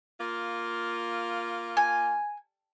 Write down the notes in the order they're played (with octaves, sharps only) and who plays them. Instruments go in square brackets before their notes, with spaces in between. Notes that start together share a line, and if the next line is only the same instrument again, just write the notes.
[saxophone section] A#3 F4
[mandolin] G#5